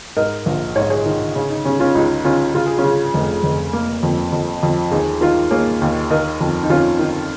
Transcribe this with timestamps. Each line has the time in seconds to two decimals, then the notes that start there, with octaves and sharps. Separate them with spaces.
0.17 G#2 A#4 D#5
0.46 A#1
0.76 G#2 C#5
0.83 D#5
0.90 G#4 C#5
1.06 D#3
1.35 C#3 C#4
1.50 D#4
1.65 C#3 C#4
1.80 C#4 F4
1.95 C#2 D#4
2.25 C#3 C#4 F4
2.54 C#3 F4
2.66 G#4
2.78 C#4 F4
2.84 C#3
3.14 F1
3.43 F1
3.73 A#3
4.03 F2
4.33 F2
4.63 F2
4.91 D#2 D#4 G#4
5.21 D#3 F4 A#4
5.51 A#3 G#4 C#5
5.82 D#2
6.10 D#3 A#4 D#5
6.41 F2
6.63 D#4
6.69 F2 C#4 F4
6.99 D#3